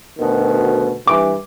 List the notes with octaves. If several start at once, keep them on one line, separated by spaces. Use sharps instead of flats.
D2 B2 D#3
G2 E3 D6